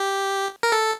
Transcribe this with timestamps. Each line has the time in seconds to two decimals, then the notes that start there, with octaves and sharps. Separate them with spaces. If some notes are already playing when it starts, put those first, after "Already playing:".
Already playing: G4
0.63 A#4
0.72 A4